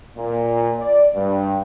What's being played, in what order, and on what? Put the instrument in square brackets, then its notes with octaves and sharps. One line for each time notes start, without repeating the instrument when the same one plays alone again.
[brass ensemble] A#2
D5
G2